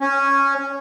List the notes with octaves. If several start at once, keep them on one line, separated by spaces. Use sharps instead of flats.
C#4